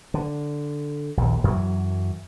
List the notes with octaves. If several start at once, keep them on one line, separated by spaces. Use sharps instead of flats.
D3
A#1 D#2
F#2 E3 F#3